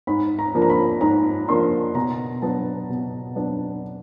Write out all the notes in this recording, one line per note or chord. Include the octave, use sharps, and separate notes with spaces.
G#2 B5
A#5
F3 A#3 D4
A#5
B5
G#2 A#5
F3 A#3 D4 C6
B2 A#5
F#3 B3 D4 A5
B2
F#3 B3 D4